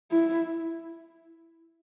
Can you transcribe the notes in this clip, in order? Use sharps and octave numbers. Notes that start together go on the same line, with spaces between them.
E4